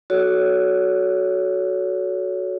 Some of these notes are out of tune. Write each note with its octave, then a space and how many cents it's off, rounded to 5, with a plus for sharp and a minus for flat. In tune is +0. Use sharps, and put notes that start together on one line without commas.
F#4 +0 A4 -25 C#5 +25